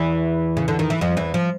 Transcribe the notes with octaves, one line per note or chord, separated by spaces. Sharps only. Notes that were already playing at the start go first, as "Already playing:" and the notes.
Already playing: E2 E3
C#3
D3
D#3
E3
F2 F3
E2 E3
F3